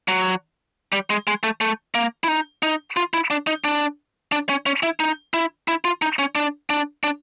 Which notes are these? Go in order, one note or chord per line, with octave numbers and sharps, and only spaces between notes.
F#3
G3
G#3
G#3
A3
A3
A#3
E4
D#4
D#4
F4
E4
D4
D#4
D4
D4
C#4
C#4
E4
D#4
E4
E4
F4
D#4
C#4
D4
D4
D4